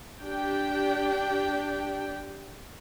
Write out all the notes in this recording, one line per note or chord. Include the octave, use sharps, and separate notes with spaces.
D4 G4 G5